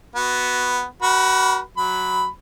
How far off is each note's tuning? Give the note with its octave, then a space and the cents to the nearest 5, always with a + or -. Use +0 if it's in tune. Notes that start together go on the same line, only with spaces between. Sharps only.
B3 +0 F#4 +0
F#4 +25 A#4 +45 B5 +0
F#3 +0 B5 +5